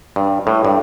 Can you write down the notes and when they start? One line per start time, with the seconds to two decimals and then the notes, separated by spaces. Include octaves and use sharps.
0.16 G2
0.47 A2
0.65 G2